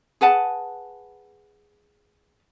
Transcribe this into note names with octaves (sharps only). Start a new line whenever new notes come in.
G#4 B4 F#5 A5